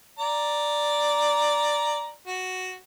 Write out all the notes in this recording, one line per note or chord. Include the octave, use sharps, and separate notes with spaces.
D5 A#5
F#4